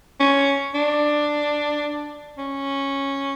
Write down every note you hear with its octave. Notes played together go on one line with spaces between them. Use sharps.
C#4
D4
C#4